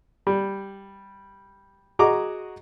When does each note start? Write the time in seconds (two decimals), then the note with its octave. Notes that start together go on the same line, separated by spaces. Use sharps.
0.27 G3
1.99 F#4 G#4 D#5 A#5 D6